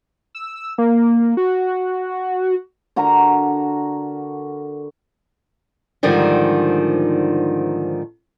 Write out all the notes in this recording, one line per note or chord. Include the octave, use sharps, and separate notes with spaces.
E6
A#3
F#4
D3 F#4 A#4 A#5
G#2 D3 D#3 F3 G3